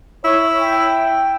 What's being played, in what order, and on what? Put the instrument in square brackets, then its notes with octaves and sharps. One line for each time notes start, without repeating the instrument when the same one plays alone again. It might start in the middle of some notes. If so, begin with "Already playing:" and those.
[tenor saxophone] E4 [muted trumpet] C#5
[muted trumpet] G5